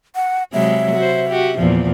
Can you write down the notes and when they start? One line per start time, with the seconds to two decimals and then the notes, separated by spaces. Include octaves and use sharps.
0.16 F#5
0.53 C3 F#3 G#3 E5
0.96 F#4 C5
1.30 F#4 G4
1.59 E2 A#2 F3